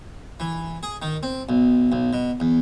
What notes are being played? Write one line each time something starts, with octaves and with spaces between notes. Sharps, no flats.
E3
G#4
D#3
C4
B1
B1
B2
E2